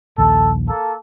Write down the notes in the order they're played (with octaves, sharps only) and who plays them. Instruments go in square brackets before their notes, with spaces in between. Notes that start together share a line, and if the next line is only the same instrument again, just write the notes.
[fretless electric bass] A#1 D#2 [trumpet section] A4
[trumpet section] A#3 A4